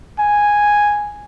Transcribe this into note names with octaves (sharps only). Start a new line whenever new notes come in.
G#5